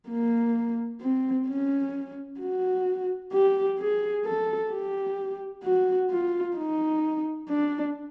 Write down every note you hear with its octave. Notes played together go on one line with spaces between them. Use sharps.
A#3
C4
C#4
F#4
G4
G#4
A4
G4
F#4
F4
D#4
D4